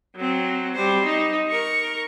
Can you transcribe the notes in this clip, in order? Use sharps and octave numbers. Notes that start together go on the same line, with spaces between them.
F#3 C4
G3 C5
D#4
A#4 C#6